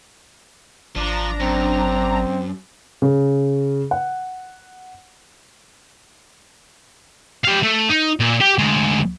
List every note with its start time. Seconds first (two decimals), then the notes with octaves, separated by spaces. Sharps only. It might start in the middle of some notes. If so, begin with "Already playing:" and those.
0.96 G#1 F3 D4 A#5
1.40 F#2 C4
3.02 C#3
3.91 F#5
7.44 G4 F5
7.63 A3
7.89 D#4
8.20 A#2
8.40 G4
8.58 D2 G#3